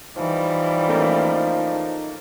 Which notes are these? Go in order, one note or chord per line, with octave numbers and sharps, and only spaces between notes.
E3 F3 G3 D#4
A3 A#3 C#4